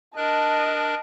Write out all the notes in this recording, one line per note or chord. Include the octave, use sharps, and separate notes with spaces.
D4 A#4 D#5 A5 F#6